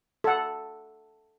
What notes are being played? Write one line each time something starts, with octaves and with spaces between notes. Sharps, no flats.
A4 F#5